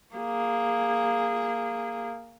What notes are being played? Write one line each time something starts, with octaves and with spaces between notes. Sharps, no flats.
A#3 G#4